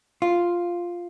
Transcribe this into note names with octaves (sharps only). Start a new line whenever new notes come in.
F4